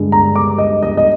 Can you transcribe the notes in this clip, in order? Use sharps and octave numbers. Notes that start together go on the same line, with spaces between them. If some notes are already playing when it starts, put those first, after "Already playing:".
Already playing: G2 D3 G#3
A#5
D6
D#5
D#5
D#5